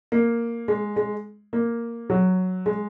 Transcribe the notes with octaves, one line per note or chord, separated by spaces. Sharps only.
A#3
G#3
G#3
A#3
F#3
G#3